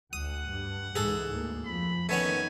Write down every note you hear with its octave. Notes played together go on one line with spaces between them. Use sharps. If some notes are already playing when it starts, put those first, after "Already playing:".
D2 F#5 D#6
G2
C#2 G#2 E3 G#4 A4
D2 A#3
F2 B5
D#3 A3 B3 C#4 G#5